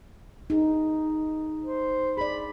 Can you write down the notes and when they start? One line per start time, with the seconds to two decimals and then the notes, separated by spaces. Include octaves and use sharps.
0.50 D#4 G#4
1.64 C5
2.17 G#4 D5 B5